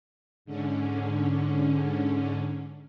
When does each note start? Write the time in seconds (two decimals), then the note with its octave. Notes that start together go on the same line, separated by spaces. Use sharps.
0.45 G#2 D3 C#4